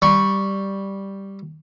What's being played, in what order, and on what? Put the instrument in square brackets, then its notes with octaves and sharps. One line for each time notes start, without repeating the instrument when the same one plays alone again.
[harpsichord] G3 C#6